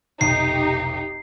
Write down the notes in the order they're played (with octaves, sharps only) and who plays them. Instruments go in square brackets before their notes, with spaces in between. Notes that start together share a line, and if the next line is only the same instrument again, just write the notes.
[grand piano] F1 B1 [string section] D#4 G4 [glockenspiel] C7